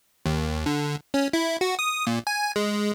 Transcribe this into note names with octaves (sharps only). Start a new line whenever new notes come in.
D#2
D3
C#4
E4
F#4
D#6
A#2
G#5
G#3